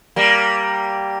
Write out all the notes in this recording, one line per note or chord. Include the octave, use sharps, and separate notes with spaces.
G3 A#3